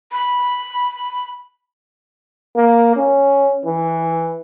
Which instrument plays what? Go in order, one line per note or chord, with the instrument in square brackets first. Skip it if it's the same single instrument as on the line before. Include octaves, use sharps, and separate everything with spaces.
[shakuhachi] B5
[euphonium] A#3
C#4
E3